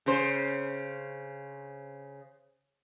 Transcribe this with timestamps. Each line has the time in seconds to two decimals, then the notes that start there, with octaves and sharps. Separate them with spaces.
0.06 C#3 C5